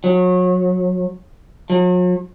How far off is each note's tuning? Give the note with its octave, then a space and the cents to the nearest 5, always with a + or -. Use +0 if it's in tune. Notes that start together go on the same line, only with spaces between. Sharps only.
F#3 -30
F#3 -45